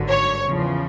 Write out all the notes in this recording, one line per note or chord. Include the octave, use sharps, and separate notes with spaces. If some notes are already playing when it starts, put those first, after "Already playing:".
Already playing: G#1 G2 D3 F#3
C#5
E2 C#3 F3